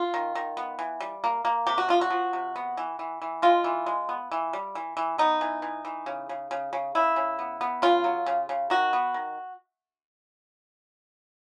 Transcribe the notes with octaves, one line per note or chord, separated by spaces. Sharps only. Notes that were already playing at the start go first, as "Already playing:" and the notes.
Already playing: F4
D#3
D#3
B3
E3
G3
A#3
A#3
C3 G4
F#4
F3 F4
F#4
F3
C3
B3
E3
E3
E3
G#3 F4
E3
G#3
B3
E3
G3
E3
E3
B3 D#4
E3
E3
E3
C#3
C#3
C#3
C#3
C#3 E4
C#3
B3
B3
C#3 F4
F#3
C#3
C#3
D#3 F#4
B3
D#3